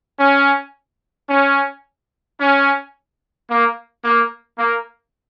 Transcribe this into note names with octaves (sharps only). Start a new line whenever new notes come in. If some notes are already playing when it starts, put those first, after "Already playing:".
C#4
C#4
C#4
A#3
A#3
A#3